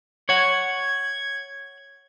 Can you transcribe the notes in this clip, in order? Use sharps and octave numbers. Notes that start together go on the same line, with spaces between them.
C#5 F#5 G#6